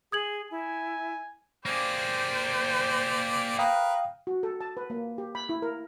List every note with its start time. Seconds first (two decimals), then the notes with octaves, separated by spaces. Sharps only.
0.12 G#4 D#6 G#6 F#7
0.51 E4 G#5
1.66 A#3 G4 G#4 C5 D5
3.59 A#4 B4 F5 G5 D#6
4.27 F#4
4.43 A4
4.61 A5
4.77 B4
4.90 A#3
5.18 G4
5.35 B5
5.49 E4
5.62 A#4